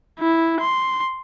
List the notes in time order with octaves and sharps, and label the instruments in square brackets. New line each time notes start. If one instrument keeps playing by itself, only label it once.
[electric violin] E4
C6